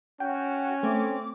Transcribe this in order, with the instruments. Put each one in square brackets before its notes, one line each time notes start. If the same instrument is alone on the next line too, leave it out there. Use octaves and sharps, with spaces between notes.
[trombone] C#4 [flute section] F#4 [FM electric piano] G5
[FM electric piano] A3 [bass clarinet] C4 [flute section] D6